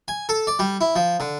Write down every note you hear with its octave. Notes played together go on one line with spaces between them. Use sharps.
G#5
A4
D5
G3
E4
F3
D3